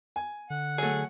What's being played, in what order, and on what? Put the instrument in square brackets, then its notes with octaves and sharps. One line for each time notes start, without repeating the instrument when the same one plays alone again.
[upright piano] G#5
[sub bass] D3 [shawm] F#5
[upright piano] F#3 A3 [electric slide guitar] G#4